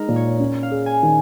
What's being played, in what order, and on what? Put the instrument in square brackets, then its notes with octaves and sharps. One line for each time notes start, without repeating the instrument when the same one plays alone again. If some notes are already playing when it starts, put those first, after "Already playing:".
Already playing: [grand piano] G#3 D#4 [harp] A#4 D#5
[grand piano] A#2
[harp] C#5
[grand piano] C#4
[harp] F5
[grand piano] G#4
[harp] G#5
[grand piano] D#3